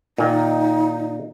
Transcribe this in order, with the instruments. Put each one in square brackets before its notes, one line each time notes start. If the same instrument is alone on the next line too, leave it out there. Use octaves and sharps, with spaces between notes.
[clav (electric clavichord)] A#2 D#3 [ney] D#4